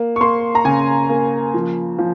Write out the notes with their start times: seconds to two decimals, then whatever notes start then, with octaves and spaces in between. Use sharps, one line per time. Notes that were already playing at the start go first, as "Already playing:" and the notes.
Already playing: A#3
0.16 C#6
0.21 A#3 C6
0.55 A#5
0.65 C#3 G#5
1.09 A#3
1.54 F3
1.99 F3